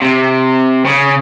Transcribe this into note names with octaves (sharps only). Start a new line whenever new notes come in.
C3
C#3